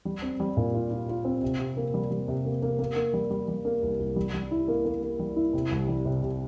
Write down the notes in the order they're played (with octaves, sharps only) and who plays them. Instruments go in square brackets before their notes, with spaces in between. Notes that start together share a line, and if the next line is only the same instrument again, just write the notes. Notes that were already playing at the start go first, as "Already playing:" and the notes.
[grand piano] G3
C4
G3
A#2
F4
F4
F4
C4
C3
C3
A#3
G3
G3
C3
A#3
A#3
A#3
A#3
G3
G3
G3
A#3
C2
C2
G3
G3
E4
A#3
A#3
A#3
G3
E4
C3
C2
G3
C3
C3